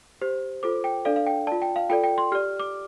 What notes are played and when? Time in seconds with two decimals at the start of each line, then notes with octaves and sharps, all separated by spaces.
0.21 G4 C5
0.63 F4 A4 C5 D6
0.84 G5
1.05 D4 A4 D5 F5
1.16 F5
1.26 G5
1.47 D5 A5
1.52 F4
1.62 G5
1.76 F5
1.90 F4 A4 D5 G5
2.04 G5
2.18 C6
2.32 G4 F6
2.35 D5
2.60 D6